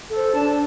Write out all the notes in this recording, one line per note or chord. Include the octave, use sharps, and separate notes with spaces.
A4 C5
D4 A5